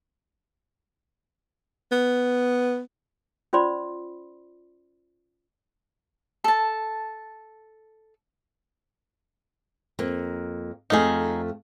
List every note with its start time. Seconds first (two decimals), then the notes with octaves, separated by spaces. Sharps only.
1.92 B3
3.53 C#4 F4 C5 D5 B5 C6
6.44 A4 A5
9.99 F2 A#3
10.90 F2 A3 D#4 G#4 F5